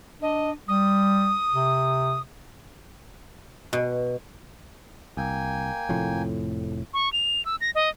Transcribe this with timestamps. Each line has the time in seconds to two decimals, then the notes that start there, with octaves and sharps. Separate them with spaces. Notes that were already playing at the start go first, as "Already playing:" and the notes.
0.22 D4 D#5
0.68 G3 D#6
1.53 C3
3.73 B2
5.17 C2 A#3 G5 G#5
5.89 F1 F2 A2
6.94 C#6
7.13 F7
7.45 E6
7.61 A#6
7.75 D#5